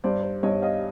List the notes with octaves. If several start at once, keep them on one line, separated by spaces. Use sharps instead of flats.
G2 C5 D5
C5
G2 C#5 D#5
D#5 F5